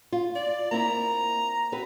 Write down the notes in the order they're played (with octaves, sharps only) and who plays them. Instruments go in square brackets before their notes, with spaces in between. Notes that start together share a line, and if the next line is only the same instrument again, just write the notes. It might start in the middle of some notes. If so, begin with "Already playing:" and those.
[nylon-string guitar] F4
[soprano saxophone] D5
[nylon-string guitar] A#3 C4 E4 [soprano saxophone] A#5
[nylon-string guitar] C4 F#4 B4